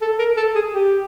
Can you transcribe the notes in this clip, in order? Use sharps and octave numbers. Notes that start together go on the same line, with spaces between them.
A4
A#4
A4
G#4
G4